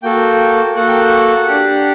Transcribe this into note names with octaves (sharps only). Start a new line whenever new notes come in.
A#3 F#4 A4 G5
A#3 F#4 A4 F#5
G5
F#5
D4 G4